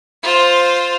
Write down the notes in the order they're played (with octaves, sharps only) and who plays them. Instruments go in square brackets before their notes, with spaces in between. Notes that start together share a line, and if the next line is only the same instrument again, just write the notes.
[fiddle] F4 C5